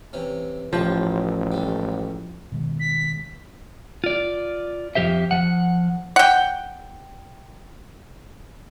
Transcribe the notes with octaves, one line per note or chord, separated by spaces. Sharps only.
C3 E3 C#4
A1 F3 G4 C#5
C#2 G3
B2 D#3 G#3
B6
F4 D5
F2 C#3 F3 G4 C5 E5
F3 F#5
F#5 G5